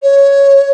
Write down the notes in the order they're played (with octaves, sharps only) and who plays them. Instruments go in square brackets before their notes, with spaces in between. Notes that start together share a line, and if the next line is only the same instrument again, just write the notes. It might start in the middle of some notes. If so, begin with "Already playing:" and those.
[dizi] C#5